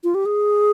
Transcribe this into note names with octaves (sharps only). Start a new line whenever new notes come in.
F4
G4
G#4